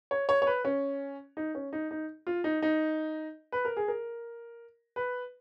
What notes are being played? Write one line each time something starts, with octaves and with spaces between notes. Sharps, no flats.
C#5
C#5
C#5
B4
C#4
D#4
C#4
D#4
D#4
F4
D#4
D#4
B4
A#4
G#4
A#4
B4